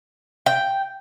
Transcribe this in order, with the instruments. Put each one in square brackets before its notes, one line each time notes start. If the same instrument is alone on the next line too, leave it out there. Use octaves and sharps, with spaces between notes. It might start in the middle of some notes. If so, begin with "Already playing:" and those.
[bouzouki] G5